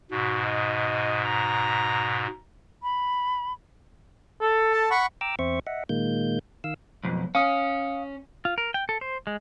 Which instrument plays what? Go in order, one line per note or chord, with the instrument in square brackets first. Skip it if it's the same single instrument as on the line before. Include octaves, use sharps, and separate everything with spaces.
[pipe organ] G#2 B2 [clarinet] F#4
[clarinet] D#5
A#5
[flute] B5
[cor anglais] A4
[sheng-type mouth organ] A5
F#5 B5 C#6
[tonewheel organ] G5 A#5 D6 E6
E2 C4 C5 E5 C#6
D#5 E5 F#5
A#2 D#3 G#3 A#3 G6
D#3 F5 E6
[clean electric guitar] B1 F2
[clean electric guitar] C#4 [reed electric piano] F5 D#6
[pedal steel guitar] F4
A#4
G5
A4
C5
G#3